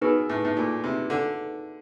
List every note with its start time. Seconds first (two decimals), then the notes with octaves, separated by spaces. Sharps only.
0.01 B2 D#4 G#4 B4
0.30 A2
0.45 A2
0.57 A#2
0.84 C3
1.10 D3